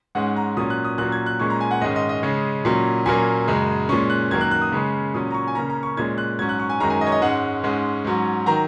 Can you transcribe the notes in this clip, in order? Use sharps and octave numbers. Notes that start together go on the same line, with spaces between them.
G#2 G#3 C#4 F#5
A#5
A#2 F#3 C#4 D#6
F#6
D#6
A#2 F#3 A#3 C#4 F#6
G#6
F#6
A#2 G#3 C#4 C#6
A#5
G#5
F#5
G#2 D#3 G#3 C#4 D#5
D#5
D#5
C#3 G#3 C#4
A#2 F#3 C#4
A#2 F#3 A#3 C#4 G#5
F#2 C#3 G#3
A#2 G#3 C#4 C#6
F#6
F#2 D#3 F#3 A#3 G#6
F#6
F#6
D#6
C#3 G#3 C#4
A#2 F#3 C#4 D#6
A#5
C#6
G#5
C#3 A#3 C#4 A#5
A#5
C#6
A#2 G#3 C#4 G#6
F#6
G#2 F#3 C#4 G#6
F#6
C#6
G#5
F#2 D#3 G#3 C#4 A#5
G#5
D#5
C#5
D#5
G#2 G#3 C#4 F#5
G#2 G#3 C#4
G#2 F#3 C#4
D#3 F#3 A#5